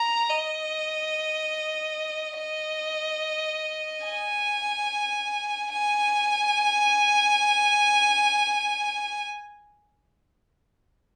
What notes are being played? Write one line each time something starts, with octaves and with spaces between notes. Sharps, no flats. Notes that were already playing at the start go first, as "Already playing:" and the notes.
Already playing: A#5
D#5
D#5
G#5
G#5